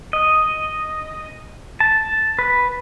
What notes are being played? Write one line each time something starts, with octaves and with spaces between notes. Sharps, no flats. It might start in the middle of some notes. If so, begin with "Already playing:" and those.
D#5
A5
B4